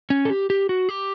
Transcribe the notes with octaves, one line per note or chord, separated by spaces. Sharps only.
C#4
A4
G4
G4
F#4
G4